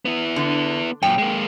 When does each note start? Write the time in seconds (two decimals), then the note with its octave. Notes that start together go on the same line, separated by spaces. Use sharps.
0.05 B3 E4
0.36 D3
1.03 F#2 A#2 G5
1.18 G#3 A#3